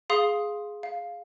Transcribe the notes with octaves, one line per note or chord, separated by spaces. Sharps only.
G#4 F5 C6 D#6
F5